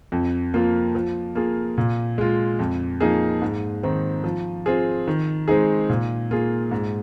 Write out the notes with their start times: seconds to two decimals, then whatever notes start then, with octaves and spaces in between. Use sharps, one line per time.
0.12 F2
0.54 F3 A#3 F4
0.95 F3
1.35 A#3 F4 G#4
1.78 A#2
2.18 G#3 F4
2.59 F2
3.00 F3 A#3 D#4 G#4
3.42 G#2
3.83 D#3 C4 D#4
4.24 F3
4.66 C4 F4 G#4
5.08 D#3
5.48 G#3 C4 D#4 G#4
5.89 A#2
6.31 A#3 F4 G#4
6.71 G#2